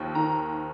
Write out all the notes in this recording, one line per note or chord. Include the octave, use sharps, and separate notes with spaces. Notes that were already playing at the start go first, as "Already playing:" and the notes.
Already playing: D#2 F3
D#3 A#5